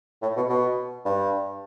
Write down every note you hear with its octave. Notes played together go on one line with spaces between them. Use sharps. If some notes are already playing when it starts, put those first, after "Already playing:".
A2
B2
B2
G2